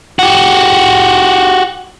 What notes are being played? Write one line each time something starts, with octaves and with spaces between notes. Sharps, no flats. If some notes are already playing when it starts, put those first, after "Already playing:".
F#4 G4